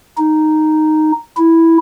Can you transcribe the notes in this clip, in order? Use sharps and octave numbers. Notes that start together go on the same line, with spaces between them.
D#4
E4